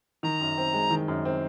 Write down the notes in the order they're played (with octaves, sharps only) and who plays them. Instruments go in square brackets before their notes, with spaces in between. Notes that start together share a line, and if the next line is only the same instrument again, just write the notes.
[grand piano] D#3 [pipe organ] A#5
[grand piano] F#2
C4
G#3
D#3
F#2
C4